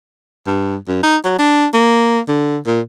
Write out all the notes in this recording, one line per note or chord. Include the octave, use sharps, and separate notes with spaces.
G2
F#2
D#4
F#3
D4
A#3
D3
A#2